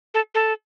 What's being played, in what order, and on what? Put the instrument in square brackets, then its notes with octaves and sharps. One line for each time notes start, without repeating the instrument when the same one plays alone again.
[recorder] A4
A4